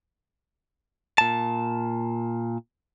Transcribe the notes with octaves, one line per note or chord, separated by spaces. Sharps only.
A#2 A5